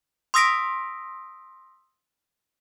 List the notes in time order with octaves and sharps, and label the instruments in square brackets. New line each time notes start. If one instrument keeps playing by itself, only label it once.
[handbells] C6 D#6 E6 A#6 B6 D7